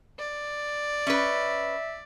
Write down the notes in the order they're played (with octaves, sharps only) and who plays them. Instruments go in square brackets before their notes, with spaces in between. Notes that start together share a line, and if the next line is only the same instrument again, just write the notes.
[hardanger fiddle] D5
[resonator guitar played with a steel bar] C#4 B4 [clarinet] E5